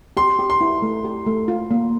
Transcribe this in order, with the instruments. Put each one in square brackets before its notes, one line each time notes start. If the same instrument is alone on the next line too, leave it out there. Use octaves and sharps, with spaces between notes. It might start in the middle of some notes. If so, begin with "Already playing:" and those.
[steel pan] G4 [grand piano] C6
[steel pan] G4
[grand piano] C6
[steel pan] E4
A3
G4
A3
F4
A#3